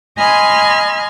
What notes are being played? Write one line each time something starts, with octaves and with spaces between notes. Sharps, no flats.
D#5 G#5 B5 C6 F6 G#6